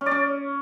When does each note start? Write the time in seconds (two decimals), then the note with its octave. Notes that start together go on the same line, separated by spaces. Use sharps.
0.01 C#4
0.06 D5
0.11 C#4